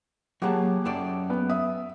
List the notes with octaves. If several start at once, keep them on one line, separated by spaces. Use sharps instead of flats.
F#3 A#3 G4 G#4 F#5 A5
F#2 A4 D5
B3
E5 D#6